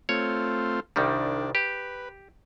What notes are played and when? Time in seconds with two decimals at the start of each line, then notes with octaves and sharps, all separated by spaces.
0.09 A3 C4 F4 C#5
0.96 C2 D#3 G3 D4
1.55 G4 B4